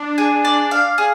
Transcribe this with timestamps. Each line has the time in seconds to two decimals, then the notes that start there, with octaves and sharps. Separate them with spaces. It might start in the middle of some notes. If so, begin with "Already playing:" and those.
Already playing: D4
0.18 G#4
0.45 D5
0.71 F5
0.98 G#4